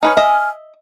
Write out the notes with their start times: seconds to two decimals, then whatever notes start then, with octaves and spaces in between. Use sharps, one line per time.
0.03 D#4 B4 C#5 G#5 F6
0.17 D#5 E5